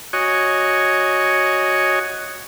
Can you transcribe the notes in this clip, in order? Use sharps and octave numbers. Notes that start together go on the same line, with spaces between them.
F#4 C#5 D#5 G#5